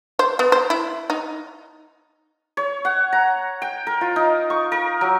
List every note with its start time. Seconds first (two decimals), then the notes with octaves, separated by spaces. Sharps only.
0.19 C5
0.39 B3
0.52 C5
0.70 E4
1.10 D#4
2.57 C#5
2.85 F#5
3.13 A#5
3.62 G5
3.87 A#4
4.01 F4
4.16 D#4
4.50 C#6
4.72 A#4
5.01 F#3